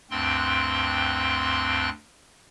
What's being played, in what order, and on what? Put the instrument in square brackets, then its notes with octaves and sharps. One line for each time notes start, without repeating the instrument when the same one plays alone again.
[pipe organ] D2 G2 C4 G5 C6 F#6